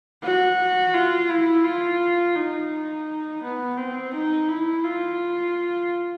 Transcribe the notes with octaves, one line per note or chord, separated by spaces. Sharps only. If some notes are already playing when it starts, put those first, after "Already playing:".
F#4
F4
E4
F4
D#4
B3
C4
D#4
E4
F4